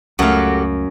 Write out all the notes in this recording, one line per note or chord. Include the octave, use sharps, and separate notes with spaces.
C#2 F#2 A3 F#4 G4 A4 F5